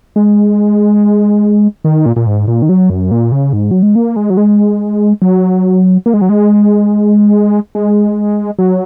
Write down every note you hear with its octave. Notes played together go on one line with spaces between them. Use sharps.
G#3
D#3
A#2
A#2
G#2
A#2
D#3
F#3
F#2
A#2
C#3
G#2
F#3
G#3
A#3
G#3
F#3
G#3
F#3
A#3
G#3
F#3
G#3
G#3
F#3